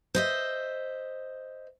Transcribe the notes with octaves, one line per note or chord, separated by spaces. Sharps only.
C5 D#5 E5